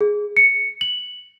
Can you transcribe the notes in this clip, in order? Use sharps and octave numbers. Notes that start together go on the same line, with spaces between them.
G#4
C#7
F#7